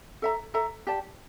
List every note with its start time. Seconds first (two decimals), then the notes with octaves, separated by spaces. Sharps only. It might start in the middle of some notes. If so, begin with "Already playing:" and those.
0.22 A4 E5 A#5
0.54 A4 E5 A#5
0.87 G4 D5 A5